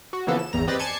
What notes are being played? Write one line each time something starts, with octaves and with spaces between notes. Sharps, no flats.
F#4
C#3 E3 F3 A#3 B3 A4
E7
G#1 E2 A#5
C4 G4 B4 D5 D#5 A6
D5 G#5 A5 C6 G#6 C#7